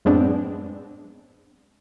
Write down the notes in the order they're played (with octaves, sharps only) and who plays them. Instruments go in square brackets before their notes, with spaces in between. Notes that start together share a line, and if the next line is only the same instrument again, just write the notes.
[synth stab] F#2 A2 G#3 B3 C4 D4